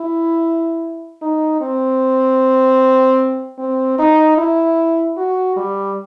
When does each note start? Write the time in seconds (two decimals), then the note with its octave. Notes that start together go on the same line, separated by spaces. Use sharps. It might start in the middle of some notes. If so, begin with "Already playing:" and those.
Already playing: E4
1.22 D#4
1.61 C4
3.58 C4
3.99 D#4
4.37 E4
5.17 F#4
5.56 G3